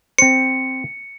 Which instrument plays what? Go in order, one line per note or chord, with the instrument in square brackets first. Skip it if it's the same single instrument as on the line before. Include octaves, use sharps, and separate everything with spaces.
[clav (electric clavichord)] C4 C5 [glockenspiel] C#7